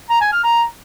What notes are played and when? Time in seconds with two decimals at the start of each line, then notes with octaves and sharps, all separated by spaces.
0.10 A#5
0.21 G#5
0.32 F6
0.44 A#5